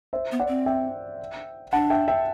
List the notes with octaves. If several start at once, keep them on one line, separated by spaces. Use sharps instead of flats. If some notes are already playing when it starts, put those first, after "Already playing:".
C5 E5
B3
D5 F#5
C4
E5 G5
D4 F#5 A5
E5 G5
E5 G5